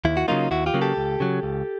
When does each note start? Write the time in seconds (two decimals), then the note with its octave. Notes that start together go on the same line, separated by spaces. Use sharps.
0.05 D#2 E4
0.17 F#4
0.28 C#3 F#3 A#3 D#4 F4
0.51 D#2 E4 F#4
0.66 F4 G4
0.74 C#3 F#3 A#3
0.81 G4 A4
0.97 C#2
1.20 C#3 F#3
1.43 C#2